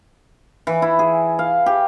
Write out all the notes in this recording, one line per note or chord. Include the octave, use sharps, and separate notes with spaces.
E3
E4
G#4
F5
G4